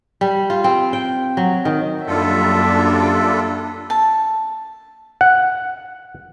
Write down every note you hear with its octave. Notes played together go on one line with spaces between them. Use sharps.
G3
F4
C4
G5
F#3
D#3
F#2 G3 A#3 D4 F4 A4 E5
A5
F#5